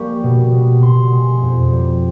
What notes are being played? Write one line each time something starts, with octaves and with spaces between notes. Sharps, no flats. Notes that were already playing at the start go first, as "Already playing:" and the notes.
Already playing: G3 A#3 C#6
B2
B3
B2 C6
G#3
F2
G3